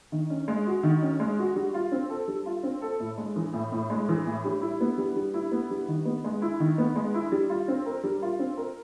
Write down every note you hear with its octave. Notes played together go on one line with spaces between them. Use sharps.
D#3
C#4
G#3
F#4
D#3
C#4
G#3
F#4
G3
F4
C4
A4
G3
F4
C4
A4
A2
G#3
E3
A2
A2
G#3
E3
A2
G3
E4
B3
G3
G3
E4
B3
G3
D#3
B3
G#3
E4
D#3
B3
G#3
E4
G3
F4
C4
A#4
G3
F4
C4
A#4